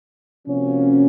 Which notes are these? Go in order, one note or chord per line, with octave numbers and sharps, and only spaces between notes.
C3 F3 A#3 C#4 F#4